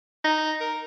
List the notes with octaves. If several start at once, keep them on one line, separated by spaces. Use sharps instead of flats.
D#4
A#4